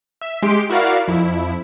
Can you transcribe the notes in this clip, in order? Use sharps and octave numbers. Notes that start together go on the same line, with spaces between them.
E5
G#3 G4 C6 D7
E4 F#4 A#4 D5 F5
F2 E4